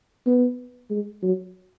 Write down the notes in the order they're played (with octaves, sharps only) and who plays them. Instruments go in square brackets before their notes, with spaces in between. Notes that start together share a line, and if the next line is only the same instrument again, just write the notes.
[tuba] B3
G#3
F#3